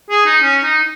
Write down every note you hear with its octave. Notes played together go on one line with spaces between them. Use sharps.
G#4
D#4
C#4
D#4